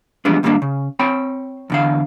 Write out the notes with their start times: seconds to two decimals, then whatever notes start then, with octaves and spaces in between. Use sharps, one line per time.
0.25 E3 F3 G3 G#3 B3 D4
0.43 D#2 G#2 G3 A3 A#3 D4
0.62 C#3
0.99 C4 C#5 G5 B5
1.70 E2 D3 F5